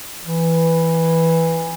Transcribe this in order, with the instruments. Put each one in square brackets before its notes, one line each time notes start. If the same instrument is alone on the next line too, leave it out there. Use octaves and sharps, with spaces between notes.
[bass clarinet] E3